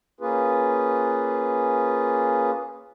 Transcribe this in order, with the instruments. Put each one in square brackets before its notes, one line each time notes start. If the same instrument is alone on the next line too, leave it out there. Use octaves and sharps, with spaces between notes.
[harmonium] A#3 C#4 F4 G#4 B4